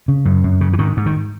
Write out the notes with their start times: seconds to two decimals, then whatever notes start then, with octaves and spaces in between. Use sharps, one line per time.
0.08 C#3
0.25 F#2
0.44 F#2
0.61 C#3
0.73 E3
0.79 G#2 D#3
0.97 G#2
1.06 D#3